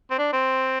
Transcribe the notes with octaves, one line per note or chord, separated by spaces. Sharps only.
C4
D4
C4